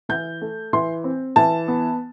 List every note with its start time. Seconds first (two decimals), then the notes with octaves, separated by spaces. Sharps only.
0.09 E3 G6
0.42 A3
0.73 E3 C6
1.04 C4
1.36 E3 A5
1.68 B3